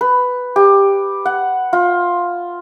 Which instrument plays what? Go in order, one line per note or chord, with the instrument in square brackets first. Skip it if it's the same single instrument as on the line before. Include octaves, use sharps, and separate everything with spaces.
[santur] B4
G4
F#5
F4